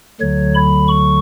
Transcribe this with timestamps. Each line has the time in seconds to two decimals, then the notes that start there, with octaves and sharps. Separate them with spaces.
0.21 D2 D3 F#3 C#5
0.55 B5
0.88 C#6